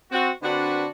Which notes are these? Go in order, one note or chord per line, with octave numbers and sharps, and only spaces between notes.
C4 F#4
D3 C4 D4 F#4 B4